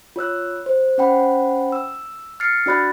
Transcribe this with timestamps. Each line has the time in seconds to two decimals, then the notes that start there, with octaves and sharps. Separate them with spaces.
0.16 F4 C#5 E6 F#6
0.66 C5
0.98 C#4 C5 F#5 G5 B5
1.72 E6
2.40 F6 A6 C7 C#7
2.66 D4 F#4 D5 B5 F#6 A6